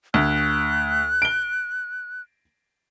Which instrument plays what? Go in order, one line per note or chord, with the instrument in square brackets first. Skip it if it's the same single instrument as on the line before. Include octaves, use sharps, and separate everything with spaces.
[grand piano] D2 [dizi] F#6
[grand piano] D7 G7